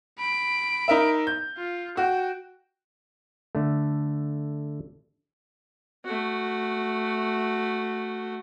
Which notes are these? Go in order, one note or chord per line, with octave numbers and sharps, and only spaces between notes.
B5 D7
D#4 A#4 E5
G6
F4
F#4 G5
D3 A3
A3 F#4